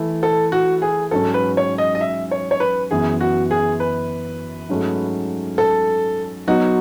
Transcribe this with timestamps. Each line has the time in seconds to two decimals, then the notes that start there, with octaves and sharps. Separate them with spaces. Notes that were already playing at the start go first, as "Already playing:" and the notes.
Already playing: E3 A3 E4
0.23 A4
0.52 F#4
0.82 G#4
1.11 G#2 F#3 C#4 A4
1.34 B4
1.57 C#5
1.78 D#5
1.95 D#5
2.01 E5
2.31 C#5
2.51 C#5
2.60 B4
2.91 F#2 E3 B3 G#4
3.21 F#4
3.51 G#4
3.80 B4
4.69 G#2 F#3 A3 C#4
5.58 A4
6.47 F#3 B3 D#4 F#4